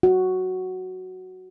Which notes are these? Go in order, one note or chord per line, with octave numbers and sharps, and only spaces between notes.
F#4